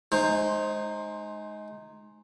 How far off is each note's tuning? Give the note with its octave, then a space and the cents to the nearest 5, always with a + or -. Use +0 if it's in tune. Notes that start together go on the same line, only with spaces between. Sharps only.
G#3 +20 D#4 -15 C5 +15